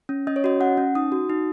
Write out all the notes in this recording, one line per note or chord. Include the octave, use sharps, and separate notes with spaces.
C#4
C#4 D#5
C#5
F#4 D#5
C#4 F#5
C#4
D#4 D#6
F#4
D#4